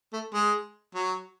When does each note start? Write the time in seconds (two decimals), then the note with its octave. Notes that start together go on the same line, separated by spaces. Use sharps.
0.13 A3
0.34 G#3
0.95 F#3